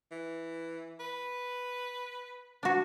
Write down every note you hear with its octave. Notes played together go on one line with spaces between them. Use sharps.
E3
B4
D4 F#4